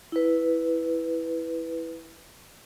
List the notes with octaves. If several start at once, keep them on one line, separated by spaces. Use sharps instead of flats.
E4 B4